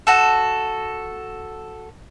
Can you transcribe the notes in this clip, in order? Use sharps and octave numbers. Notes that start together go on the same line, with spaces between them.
F#4 A4